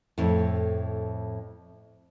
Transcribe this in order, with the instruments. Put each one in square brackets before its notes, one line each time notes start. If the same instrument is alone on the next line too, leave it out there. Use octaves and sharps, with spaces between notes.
[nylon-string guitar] F2 A2